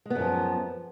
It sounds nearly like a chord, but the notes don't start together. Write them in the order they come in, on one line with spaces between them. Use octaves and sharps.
G#3 B3 F#2 F3